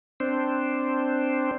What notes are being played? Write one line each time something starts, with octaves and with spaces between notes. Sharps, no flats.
C4 D4 C5